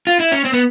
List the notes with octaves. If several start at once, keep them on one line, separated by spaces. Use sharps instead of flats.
F4
E4
C#4
C4
B3